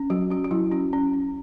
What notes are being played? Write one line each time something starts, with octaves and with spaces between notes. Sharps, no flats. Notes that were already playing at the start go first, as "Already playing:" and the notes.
Already playing: C#4
F#3 F#4
C#4 F#4
F#4
F#3 E4
C#4 F#4
C#4
C#4